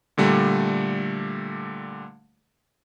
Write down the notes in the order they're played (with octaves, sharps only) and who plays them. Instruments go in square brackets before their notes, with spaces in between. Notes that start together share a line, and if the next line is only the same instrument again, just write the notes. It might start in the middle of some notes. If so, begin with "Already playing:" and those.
[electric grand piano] A#2 D3 G3 A3